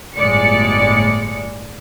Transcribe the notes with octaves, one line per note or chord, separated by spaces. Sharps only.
G1 A2 G#3 D5 C#7